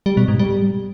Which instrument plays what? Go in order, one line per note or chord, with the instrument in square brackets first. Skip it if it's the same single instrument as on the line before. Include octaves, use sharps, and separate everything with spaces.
[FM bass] G3
B2
G#2
G3